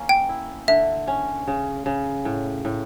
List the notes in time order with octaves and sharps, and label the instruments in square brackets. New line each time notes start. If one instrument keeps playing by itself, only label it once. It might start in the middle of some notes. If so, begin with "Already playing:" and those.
Already playing: [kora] A#3 C#4
[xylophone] G5
[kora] E4
[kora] D3 [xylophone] E5
[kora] C#4
C#3
C#3
A2
A2